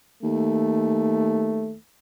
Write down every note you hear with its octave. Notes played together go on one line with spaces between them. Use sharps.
D#2 A3